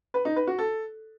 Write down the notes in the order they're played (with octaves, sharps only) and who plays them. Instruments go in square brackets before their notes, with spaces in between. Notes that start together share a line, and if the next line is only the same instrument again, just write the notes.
[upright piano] B4
D#4
B4
F#4
A4